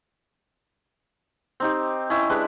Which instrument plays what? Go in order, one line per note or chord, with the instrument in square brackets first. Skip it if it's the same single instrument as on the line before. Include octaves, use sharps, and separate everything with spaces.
[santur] C4 D#4 G4
C#4 E4 D#5
G#3 D4 G4 B4